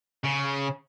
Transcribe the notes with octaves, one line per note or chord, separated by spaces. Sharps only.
C#3